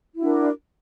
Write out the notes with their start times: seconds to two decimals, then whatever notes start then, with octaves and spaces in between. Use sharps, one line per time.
0.14 E4
0.17 F#4
0.21 D4
0.24 A#4